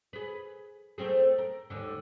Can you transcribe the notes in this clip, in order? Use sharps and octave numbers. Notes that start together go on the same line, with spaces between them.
G#4 B4
A3 C4 G#4
A#4
D#2 G#2 D3